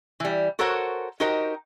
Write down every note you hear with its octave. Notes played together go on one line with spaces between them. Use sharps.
E3 G3
F#4 A4 A#4 C5 C#5 F#5
D#4 F#4 G4 A#4 C5 D#5